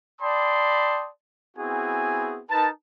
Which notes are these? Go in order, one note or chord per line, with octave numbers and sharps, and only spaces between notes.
D5 G5 A5 B5 C6 D#6
B3 C4 E4 F#4 G#4 G#5
D#4 A#4 B4 A5